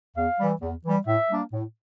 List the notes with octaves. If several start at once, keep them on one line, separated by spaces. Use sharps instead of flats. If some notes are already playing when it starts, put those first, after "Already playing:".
E2 F5
E3 G3
E2
E3 G3
A2 E5
G3 A#3 D4
A2